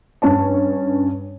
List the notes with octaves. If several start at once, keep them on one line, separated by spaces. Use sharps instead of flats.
G2 C#4 C#5 A5